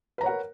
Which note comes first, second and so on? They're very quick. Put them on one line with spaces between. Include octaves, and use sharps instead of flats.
B4 A#5 C#5 F#5 A#4